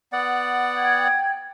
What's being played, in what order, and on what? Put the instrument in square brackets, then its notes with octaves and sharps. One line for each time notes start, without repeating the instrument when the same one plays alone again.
[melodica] B3 D5 F#5
[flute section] G5 G#6